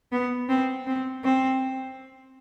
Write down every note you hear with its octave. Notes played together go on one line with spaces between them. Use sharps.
B3
C4
C4
C4